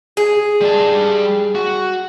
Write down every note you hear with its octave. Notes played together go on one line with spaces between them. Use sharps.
G#4
G3 A5
F#4